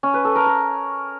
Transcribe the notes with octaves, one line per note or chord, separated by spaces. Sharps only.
C#4
B4
A4
A#4
A#4